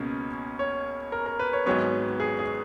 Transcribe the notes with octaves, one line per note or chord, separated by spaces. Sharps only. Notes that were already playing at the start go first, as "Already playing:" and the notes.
Already playing: C#2 B2 A#3 C#4
C#5
A#4
A#4
B4
C#5
G#1 G#2 F#3 B3 C#5
G#4
G#4